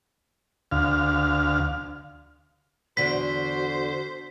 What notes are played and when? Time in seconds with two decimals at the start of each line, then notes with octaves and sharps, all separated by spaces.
0.71 D2 F5
2.97 E2 D3 F#4 C5 B6